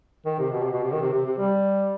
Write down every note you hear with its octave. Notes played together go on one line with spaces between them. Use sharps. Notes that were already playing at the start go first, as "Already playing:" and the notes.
D#3
C3
B2
C3
B2
C3
D#3
C3
C3
C3
G3